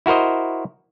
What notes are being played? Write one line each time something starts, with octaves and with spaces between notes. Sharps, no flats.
E4 F#4 A#4 C5 D#5